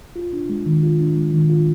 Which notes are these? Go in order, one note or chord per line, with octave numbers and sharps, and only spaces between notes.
F4
D4
G#3
D#3
F4
D4
G#3
D#3
F4